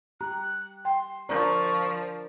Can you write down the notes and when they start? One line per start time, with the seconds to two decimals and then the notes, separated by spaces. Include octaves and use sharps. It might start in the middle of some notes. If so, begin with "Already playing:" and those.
0.21 G4 A#5 F#6
0.85 G5 C6
1.29 F3 D4 A#4 D5 A#5 C#6